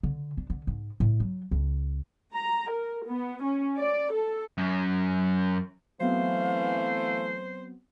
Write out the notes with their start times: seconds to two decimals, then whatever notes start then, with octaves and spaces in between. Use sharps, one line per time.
0.03 D3
0.37 D4
0.50 D3
0.67 G#2
1.00 A2
1.20 F#3
1.51 C#2
2.34 A#5
2.71 A#4
3.07 B3
3.44 C#4
3.79 D5
4.14 A4
4.58 F#2
6.00 E3 F#3 A3 B3 C4 C5 F5